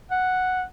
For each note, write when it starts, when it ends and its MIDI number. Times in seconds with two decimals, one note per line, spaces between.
0.11 0.64 78